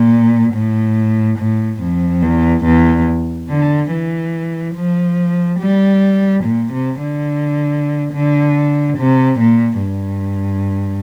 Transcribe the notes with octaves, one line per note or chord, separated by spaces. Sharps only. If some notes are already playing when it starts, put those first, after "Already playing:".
Already playing: A#2
A2
A2
F2
E2
E2
D3
E3
F3
G3
A#2
C3
D3
D3
C3
A#2
G2